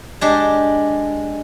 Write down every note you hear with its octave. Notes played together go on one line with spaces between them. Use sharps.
G#3 D4 G4